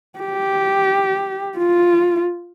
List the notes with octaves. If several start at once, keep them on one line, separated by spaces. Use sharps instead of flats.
G4
F4